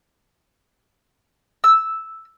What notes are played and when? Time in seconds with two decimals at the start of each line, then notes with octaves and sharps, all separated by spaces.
1.64 E6